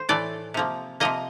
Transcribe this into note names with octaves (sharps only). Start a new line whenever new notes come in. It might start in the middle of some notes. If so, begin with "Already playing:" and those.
Already playing: C5
A2 E3 A3 D5
C3 F3 A#3
C3 F3 A#3 D#5